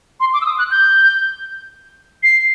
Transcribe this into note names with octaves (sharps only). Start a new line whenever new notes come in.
C6
D6
E6
D#6
F#6
G6
C7